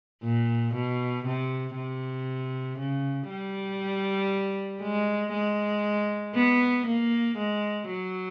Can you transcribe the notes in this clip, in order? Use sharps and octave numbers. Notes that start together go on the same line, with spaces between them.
A#2
B2
C3
C3
C#3
G3
G#3
G#3
B3
A#3
G#3
F#3